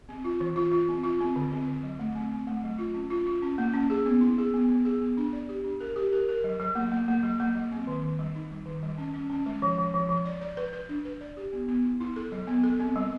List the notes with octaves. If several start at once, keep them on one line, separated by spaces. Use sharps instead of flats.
C4
F4
E3
F4
F4
C4
F4
C4
D3
C4
D3
F#3
A3
C4
C4
A3
F#3
F4
C#4
F4
F4
C#4
A#3
C#4
G#4
B3
E4
G#4
B3
B3
G#4
B3
D4
D5
G4
D4
A#4
G4
A#4
A#4
F#3
F#3
A#3
A#3
A#3
F#3
A#3
F#3
C4
D#3
D#3
G3
D#4
G3
D#3
G3
C#4
C#4
C#4
G#3
F3
F3
F3
F3
D5
D5
B4
B4
D4
B4
D5
G4
B3
B3
E4
E4
A4
F#3
B3
A4
C4
G3